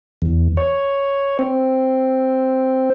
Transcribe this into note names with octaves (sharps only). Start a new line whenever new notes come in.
E2
C#5
C4